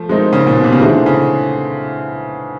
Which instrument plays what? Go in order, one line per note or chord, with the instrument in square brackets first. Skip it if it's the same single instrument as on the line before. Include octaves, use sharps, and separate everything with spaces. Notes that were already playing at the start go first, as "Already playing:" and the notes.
Already playing: [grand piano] F3 A3
[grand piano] D#3 [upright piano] G#3 C4 D#4
[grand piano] C#3
A#2
B2
C3
C#3
[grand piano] D3 [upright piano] E3 A3 C4 D#4 G#4
[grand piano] C#3